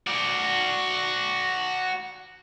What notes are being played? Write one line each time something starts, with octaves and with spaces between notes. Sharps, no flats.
F#4 D5